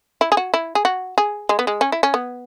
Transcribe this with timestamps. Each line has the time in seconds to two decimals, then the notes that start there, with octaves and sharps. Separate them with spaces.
0.21 E4
0.32 G#4
0.37 F#4
0.54 E4
0.75 G#4
0.85 F#4
1.18 G#4
1.49 G#3
1.59 B3
1.67 G#3
1.81 C#4
1.92 E4
2.03 C#4
2.14 B3